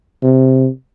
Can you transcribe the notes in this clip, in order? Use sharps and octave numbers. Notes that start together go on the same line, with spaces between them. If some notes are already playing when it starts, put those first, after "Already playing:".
C3